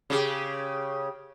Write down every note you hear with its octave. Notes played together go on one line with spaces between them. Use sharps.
C#3 G4